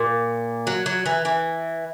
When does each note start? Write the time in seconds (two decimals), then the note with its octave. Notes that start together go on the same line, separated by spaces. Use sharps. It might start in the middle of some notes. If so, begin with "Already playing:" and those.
Already playing: A#2
0.67 F#3
0.86 F#3
1.06 E3
1.25 E3